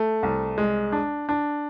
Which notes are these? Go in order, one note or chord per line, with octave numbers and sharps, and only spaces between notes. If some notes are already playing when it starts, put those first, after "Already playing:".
Already playing: A3
C2
G#3
D4
D4